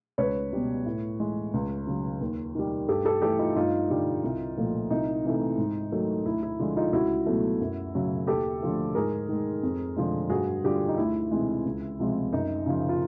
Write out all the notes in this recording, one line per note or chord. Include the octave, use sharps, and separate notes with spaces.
C#2 B4 C#5
B2 G3
A2
E3 G#3
C#2
C#3 F#3
D#2
D#3 G3
G2 G4 A4
G4 A4
E3 A3 G4 A4
D#4 F4
G2 D#4 F4
D3 G3
C2
A#2 F3 A3
C2 D#4
C3 E3 A3
G#2
D#3 F#3 A3
D2 E4
E4
D3 F3 G#3
D#4 F4
C#2 E4 F#4
B2 F#3 A3
F#2
C#3 F#3
D#2 G4 A4
D3 F3 A3
G#2 G#4 A#4
D#3 G#3
F2
D3 F3 G#3
G2 F#4 G#4
D3 G3 F4 G4
D#4
D2 E4
C3 E3 G#3
C#2
C3 F3 G#3
F#2 D#4
C#3 F3
F4